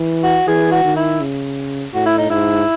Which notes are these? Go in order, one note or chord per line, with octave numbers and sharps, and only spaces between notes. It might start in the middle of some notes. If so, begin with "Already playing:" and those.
Already playing: E3
F#4
E3 G#4
F#4
D#3
E4
C#3
A2 F#4
E4
D#4
G#2 E4